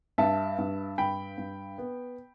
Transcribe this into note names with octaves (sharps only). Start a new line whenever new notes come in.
G2 E5 A5
G2
G2 G5 B5
G2
B3